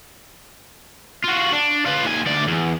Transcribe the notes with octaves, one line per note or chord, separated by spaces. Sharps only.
F4 F#4
D4
F4 B4
D#2 G#5
D2 D5
E2